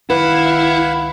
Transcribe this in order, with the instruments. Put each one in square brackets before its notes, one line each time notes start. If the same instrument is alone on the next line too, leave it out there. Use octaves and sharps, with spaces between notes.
[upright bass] C#2 D#3 [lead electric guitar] E4 [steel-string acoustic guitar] B4 [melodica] F5 F#5 B5